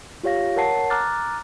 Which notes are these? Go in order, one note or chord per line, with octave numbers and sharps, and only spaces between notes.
F4 G4 C#5 F5 A#6
A#4 C#5 F#5 A5 C7
A#5 D6 F6 F#6 A6